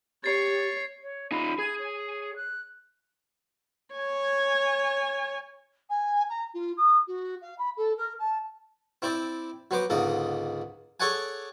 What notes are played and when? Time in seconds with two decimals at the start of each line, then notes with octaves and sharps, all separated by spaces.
0.24 G4 C#5 A6 C7
1.03 C#5
1.31 D#4 F4 B5
1.59 G#4 G#6
1.78 C#5
2.36 F#6
3.95 C#5 G#5
5.89 G#5
6.29 A#5
6.54 F4
6.77 D#6
7.07 F#4
7.41 F5
7.58 B5
7.77 A4
7.97 A#4
8.19 A5
9.02 C4 E4 C5 D5
9.71 F#3 B3 C5 D6
9.90 C#2 G#2 D3 A#3 D#5
11.00 G#4 A4 C#5 D5 F#5 G#5